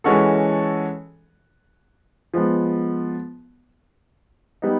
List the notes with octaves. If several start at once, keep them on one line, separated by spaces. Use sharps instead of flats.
E3 G#3 C#4 F#4 A4
F3 G#3 B3
G3 B3 D#4